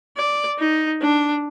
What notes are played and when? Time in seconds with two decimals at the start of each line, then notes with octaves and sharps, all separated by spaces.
0.17 D5
0.59 D#4
1.02 D4